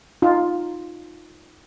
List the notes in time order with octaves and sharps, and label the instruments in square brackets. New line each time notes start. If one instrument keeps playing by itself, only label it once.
[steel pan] D#4 F4